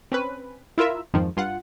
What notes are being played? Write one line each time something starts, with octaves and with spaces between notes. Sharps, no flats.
C4 C#4 B4
E4 F4 A#4 E5
F2 G#2 D#3 F3
G2 F4 F#5